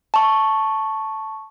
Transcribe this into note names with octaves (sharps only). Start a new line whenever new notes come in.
A5 C#6